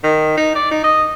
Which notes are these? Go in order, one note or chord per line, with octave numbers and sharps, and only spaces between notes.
D#3
D#4
D5
D#4
D#5